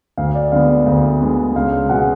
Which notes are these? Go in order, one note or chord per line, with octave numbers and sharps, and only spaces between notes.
D2 F5
D5
D3 G#3 B3 F5
F5
D2
D3 G#3 B3
C#2 F5
B2 G#3 B3 F#5